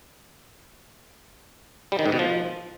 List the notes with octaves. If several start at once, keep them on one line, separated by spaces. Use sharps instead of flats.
G3
D#3
G#2
B2
F3